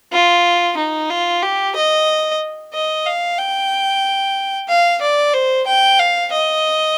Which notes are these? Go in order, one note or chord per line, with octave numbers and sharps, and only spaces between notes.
F4
D#4
F4
G4
D#5
D#5
F5
G5
F5
D5
C5
G5
F5
D#5